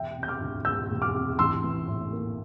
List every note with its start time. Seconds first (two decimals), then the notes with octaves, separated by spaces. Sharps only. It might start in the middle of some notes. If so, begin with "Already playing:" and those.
Already playing: E1 E5 G5
0.16 C3
0.23 G6
0.28 D6 F6
0.41 D2
0.65 E1 E6 G6
0.90 E1
1.02 D6 F6
1.15 C3
1.39 A1 C6 E6
1.64 E3
1.88 A2
2.13 A#3